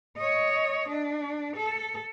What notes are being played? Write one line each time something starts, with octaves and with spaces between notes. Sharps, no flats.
C#5 D#5
D4
A4